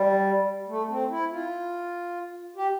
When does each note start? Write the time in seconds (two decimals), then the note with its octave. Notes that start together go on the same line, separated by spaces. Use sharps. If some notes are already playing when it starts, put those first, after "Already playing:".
Already playing: G3
0.68 A3
0.89 C4
1.10 E4
1.30 F4
2.56 G4